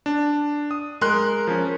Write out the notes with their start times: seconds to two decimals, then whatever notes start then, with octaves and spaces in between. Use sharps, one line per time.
0.06 D4
0.71 D#6
1.01 G#3 A#4 C6 F#6
1.47 F3 C#4